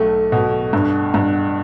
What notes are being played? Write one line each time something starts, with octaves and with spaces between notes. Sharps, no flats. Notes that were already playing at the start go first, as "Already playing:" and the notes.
Already playing: B1 A3
B2
G2
G2